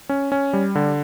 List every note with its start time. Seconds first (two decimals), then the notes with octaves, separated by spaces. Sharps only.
0.09 C#4
0.32 C#4
0.53 G3
0.75 D3